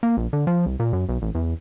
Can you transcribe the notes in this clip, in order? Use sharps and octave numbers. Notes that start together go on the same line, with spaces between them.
A#3
A#1
D3
F3
C2
A#2
F#2
B1
A1
E2